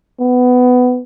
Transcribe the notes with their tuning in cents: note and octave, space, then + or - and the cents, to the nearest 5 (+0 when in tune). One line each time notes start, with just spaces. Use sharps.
B3 +15